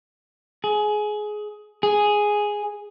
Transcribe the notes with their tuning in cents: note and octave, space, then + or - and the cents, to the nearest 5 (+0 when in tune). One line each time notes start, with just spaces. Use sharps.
G#4 +20
G#4 +0